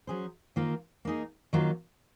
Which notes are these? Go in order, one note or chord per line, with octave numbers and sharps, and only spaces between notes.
F#3 C#4 G#4 C5
D#3 A#3 F4 C5
A#3 D#4 G#4
D#3 F#3 A#3 F4 C5